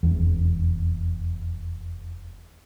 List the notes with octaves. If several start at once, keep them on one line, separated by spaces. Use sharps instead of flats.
F1 E2